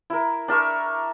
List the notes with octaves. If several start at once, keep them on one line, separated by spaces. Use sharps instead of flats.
E4 A#4
D4 A#4 E5 C#6